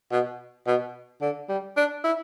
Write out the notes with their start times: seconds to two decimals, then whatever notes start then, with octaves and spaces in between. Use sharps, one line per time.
0.12 B2
0.67 B2
1.21 D3
1.49 G3
1.77 D4
2.04 E4